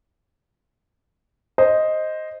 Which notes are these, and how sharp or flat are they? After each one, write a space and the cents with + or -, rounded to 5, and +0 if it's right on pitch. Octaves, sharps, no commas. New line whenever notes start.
C5 +0 D#5 +0